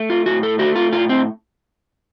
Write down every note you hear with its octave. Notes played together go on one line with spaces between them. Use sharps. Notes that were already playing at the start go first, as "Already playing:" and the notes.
Already playing: A3
F4
A2 F#4
A4
A3 F#4
F4
A2 F4
C4